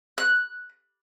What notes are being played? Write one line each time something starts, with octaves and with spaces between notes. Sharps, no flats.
F#6